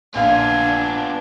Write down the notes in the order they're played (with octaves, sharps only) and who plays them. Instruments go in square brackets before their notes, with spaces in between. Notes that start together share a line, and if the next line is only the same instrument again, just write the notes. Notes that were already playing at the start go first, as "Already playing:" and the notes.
[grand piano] A#1 F5 [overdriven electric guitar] B3 F4 [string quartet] D4 [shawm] G#5